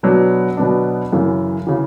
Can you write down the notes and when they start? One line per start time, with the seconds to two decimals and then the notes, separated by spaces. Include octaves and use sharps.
0.03 B2 F#3 B3 D4
0.57 B2 F#3 B3 D4
1.13 F#2 C#3 E3
1.67 C#3 E3